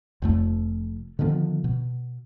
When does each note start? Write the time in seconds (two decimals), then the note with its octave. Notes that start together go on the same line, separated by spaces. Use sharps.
0.22 F1 F2 A3
1.19 D3 D#3 F3 B3
1.64 B2